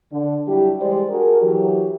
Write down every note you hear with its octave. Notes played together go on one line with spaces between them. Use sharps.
D3
F#3 G3 D4 E4 G4
E3 G3 G#3 G4 C5 D5
D4 F#4 G#4 A#4
E3 F#3 G4